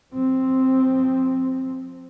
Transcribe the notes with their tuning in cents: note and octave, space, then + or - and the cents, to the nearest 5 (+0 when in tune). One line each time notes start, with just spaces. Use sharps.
F3 +15 C4 +0